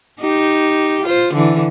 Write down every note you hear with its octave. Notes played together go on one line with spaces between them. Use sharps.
D#4 G4
F4 C5
D3 E3